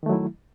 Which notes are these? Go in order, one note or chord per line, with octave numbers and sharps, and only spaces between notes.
D#3 F#3 A3 E4